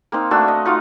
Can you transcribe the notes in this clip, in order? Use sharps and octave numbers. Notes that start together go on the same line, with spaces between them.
A#3 C4 D#4
A3 D4 F#4 E6
D#5
D#4 F4 F#4 F5